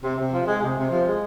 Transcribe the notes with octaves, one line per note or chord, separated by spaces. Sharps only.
C3
C3
F3
G#3
C3
C3
F3
G#3